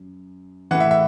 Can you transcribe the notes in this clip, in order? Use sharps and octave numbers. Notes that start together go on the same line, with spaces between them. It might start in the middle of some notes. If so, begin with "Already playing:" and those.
Already playing: F#2
A2 E3 F#5
E5
E5